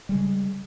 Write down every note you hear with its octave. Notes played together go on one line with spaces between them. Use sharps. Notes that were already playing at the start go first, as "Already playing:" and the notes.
C#3 G3 G#3